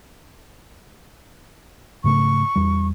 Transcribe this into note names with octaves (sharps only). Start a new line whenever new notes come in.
G#2 C#3 A3 C#6
E2 G3